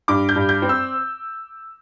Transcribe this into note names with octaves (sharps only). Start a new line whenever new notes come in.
G2 D6
G6
G2
G6
C4
E6